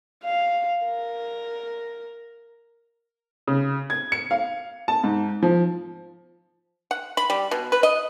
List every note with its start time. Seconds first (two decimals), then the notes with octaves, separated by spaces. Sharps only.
0.24 F5
0.86 A#4
3.48 C#3
3.90 G#6
4.12 C#7
4.31 F5
4.88 A5
5.04 G#2
5.42 F3
6.91 F#5
7.17 B5
7.30 G3
7.51 B2
7.72 B4
7.83 D#5